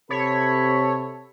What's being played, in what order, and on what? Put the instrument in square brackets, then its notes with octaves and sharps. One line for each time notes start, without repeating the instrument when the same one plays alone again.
[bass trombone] C3 [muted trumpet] A4 [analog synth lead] C#5 [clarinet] B5